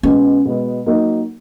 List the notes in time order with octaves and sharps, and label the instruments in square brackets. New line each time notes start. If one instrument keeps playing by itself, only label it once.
[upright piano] B2 G#3 B3 [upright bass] C#4
[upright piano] B2 G#3 B3
F#3 A#3 D#4